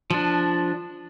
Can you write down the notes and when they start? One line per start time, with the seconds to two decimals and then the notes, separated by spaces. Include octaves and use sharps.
0.10 F3 D4